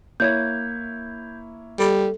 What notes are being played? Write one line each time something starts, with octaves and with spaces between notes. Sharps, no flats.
A#3 E4 C#5 G6 G#6
G3 A4